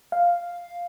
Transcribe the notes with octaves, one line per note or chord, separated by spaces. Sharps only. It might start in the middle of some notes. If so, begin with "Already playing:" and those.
F5